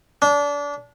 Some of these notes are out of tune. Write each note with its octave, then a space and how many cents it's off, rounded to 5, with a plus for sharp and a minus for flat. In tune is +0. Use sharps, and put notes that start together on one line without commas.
D4 -25